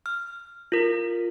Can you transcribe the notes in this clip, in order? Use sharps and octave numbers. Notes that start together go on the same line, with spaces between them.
F6
F4 A#4